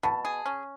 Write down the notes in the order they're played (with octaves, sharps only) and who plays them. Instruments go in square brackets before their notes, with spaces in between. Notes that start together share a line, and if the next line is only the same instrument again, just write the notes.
[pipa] B2 [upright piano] A5
[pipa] G#4
C#4